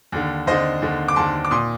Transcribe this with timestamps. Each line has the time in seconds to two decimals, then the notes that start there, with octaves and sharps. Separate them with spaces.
0.12 D#2 D3
0.47 D#2 D3 C5 D#5
0.82 D#2 D3
1.08 D6
1.16 D#2 D3 A5 C6
1.45 D6
1.51 A#2 C6 D#6